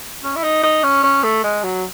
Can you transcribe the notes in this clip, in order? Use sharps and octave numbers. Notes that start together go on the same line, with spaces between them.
C#4
E4
D#4
D#4
C#4
C#4
A3
G#3
F#3